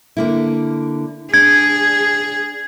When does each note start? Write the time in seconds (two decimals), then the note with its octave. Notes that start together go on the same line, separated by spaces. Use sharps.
0.17 D3 A#3 E4
1.34 D4 G#4 G#6